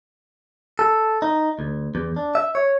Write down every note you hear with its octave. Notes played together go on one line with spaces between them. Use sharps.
A4
D#4
D2
E2
D4
E5
C#5